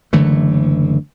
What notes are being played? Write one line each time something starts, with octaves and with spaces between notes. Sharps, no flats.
F#1 D3 E3 A3